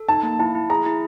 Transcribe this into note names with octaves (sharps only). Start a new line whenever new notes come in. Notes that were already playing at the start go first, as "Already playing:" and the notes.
Already playing: A4
D#4 A5
A#3
E4 A5
E4
G#4 A#5
E4